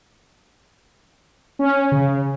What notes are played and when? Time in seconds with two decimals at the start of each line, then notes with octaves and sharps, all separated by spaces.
1.59 C#4
1.92 C#3